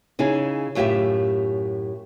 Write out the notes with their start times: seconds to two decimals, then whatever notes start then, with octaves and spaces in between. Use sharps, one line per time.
0.19 C#3 D#4 E4 G#4
0.75 F#2 A2 E4 F4 G4 E5